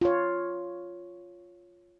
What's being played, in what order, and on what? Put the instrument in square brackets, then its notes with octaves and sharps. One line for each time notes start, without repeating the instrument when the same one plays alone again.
[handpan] F4 C#5